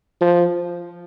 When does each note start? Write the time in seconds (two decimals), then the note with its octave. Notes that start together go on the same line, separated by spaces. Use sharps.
0.21 F3